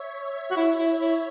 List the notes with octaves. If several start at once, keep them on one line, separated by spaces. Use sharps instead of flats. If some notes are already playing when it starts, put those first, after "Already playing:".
Already playing: C#5 E5
F#4
E4
E4
E4